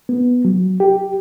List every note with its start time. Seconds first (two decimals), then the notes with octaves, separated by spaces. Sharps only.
0.09 B3
0.45 F#3
0.80 G4